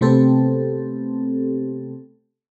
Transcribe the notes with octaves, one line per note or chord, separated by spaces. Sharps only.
C3 A3 B3 C4 G4 A4